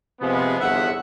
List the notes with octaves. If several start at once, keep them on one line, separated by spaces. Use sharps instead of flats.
C3 F3 G#3 B3
G1 E2 E5 F#5